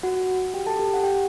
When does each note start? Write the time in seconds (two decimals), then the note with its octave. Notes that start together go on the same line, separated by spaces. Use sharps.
0.03 F#4 F#5
0.54 G4 G5
0.66 A4 A5
0.79 G4 G5
0.94 F#5
1.03 G4 G5